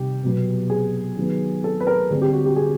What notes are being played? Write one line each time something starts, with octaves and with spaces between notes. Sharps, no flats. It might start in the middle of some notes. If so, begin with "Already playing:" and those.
Already playing: C3 D#3 G3 C4 G4
B2 F#3 B3
G#4
D#3 F#3 B3
A4
B4
A#4
D3 G3 C4 G#4
G4
F#4
G4
G#4